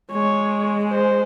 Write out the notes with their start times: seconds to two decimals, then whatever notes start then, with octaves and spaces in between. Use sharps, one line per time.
0.11 G#3 C#5
0.90 C5